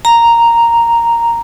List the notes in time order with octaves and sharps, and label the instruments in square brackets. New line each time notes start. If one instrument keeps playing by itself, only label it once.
[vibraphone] A#5